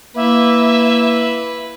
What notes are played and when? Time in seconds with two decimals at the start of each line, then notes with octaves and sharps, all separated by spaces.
0.16 A#3 E4 B4 E5